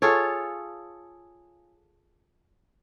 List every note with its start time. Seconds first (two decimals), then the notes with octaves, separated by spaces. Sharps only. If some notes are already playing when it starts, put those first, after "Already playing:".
0.02 F4 G#4 A4 C#5